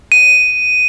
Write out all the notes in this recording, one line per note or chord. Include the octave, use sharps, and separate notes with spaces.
D#7